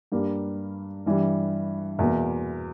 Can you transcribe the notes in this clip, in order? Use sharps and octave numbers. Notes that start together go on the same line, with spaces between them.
G2 G3 A#3
G2 E3 G3
E2 B2 A#3